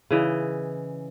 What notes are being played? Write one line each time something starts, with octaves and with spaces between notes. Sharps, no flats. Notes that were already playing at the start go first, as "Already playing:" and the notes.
C#3 E3 D#5